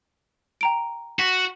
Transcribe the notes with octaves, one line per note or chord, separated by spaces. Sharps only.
G5 A#5 D7
F#4 B6